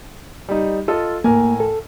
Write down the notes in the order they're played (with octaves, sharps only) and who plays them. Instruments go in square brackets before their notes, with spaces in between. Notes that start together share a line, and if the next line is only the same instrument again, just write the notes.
[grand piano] G3 D#4
F4 A4 D#5
[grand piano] A2 A#4 G#5 [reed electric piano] A#3
[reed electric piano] A4